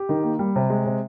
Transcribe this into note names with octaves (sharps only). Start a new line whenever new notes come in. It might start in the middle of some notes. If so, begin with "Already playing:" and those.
Already playing: G4
D#3
A#3
G3
C3
G#3
C3